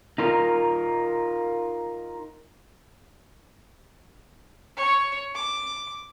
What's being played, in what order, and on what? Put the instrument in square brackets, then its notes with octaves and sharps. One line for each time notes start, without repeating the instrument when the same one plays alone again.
[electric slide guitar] D#4 F4 A#4
[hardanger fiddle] C#5
D6